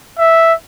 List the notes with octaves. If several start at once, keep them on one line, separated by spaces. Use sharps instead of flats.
E5